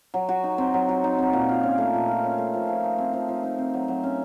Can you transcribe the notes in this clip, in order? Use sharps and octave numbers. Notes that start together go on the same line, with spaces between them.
F#3
F#4
D#4
C4
F#3
F#4
D#4
C4
A#2
F4
C#4
A3
A#2
F4
C#4
A3
F3
F3
D#4
C4
F3
F3
D#4
C4
F#3
F#3
C#4